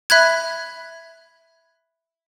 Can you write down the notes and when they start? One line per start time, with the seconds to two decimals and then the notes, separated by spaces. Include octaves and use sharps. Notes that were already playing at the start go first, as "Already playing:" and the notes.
0.10 E5 B5 F#6 G#6